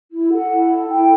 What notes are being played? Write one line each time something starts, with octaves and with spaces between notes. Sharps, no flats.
E4
A4 F#5
E4
A4
E4 G5